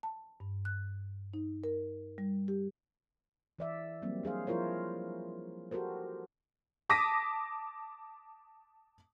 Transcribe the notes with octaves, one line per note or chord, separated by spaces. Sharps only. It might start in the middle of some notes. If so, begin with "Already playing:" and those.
A5
G2
F#6
D#4
A#4
G3
G4
E3 D5 E5
F#3 G3 A#3 C4
D4 G#4 C5 F5
F3 E4 F4 A#4 C5 C#5
F#4 G4 A4 A#4 C5
A5 D6 D#6 A#6 B6 D#7